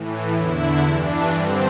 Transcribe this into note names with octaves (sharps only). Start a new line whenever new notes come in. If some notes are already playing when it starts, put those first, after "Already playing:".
Already playing: A2 E3
E2 D3 E4
G2 E3 D4
G2 D3 C4